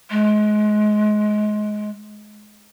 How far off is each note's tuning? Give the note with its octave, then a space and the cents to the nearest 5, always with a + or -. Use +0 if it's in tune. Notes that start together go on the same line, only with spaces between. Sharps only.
G#3 +25